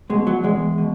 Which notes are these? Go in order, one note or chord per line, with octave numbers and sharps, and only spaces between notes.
B2 G#3
F#3
E2 G#3
B2